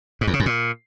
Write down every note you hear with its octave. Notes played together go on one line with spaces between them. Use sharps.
G#2
E2
C#3
F#2
A#2